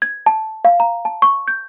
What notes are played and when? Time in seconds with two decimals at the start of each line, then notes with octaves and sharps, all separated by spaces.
0.02 G#6
0.26 A5
0.65 F5
0.80 A#5
1.05 A5
1.22 C#6
1.48 G6